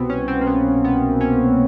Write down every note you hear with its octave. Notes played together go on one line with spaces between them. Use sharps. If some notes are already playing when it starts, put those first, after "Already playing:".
Already playing: C2 B2 B3 C4
C#4
C4
A#3
B3
B3
C#4